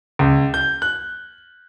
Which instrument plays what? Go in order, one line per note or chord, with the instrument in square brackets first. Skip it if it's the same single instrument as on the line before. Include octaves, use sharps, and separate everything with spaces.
[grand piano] C#2
G6
F#6